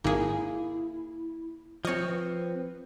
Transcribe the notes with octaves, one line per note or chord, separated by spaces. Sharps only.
G#1 A#3 E4 G#4
F3 C4 C#5 D#5
B4